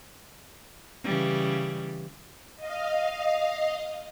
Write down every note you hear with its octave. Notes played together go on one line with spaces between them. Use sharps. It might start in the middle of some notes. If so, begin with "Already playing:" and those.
C#3 E3 G3
D#5 F5